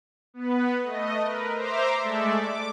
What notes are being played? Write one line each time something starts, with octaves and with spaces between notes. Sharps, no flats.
B3 B4
A3 D#5
A#4 B4
C5 E5 A#5 C6 D6
G#3 A3 A4 D5 E5
D6